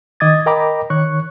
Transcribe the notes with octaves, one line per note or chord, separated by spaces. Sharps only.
D#3 D#5 D6 D#6 G#6 A6
A#4 D#5 G5 A#5 B5 D6
D#3 C#5 C#6 F#6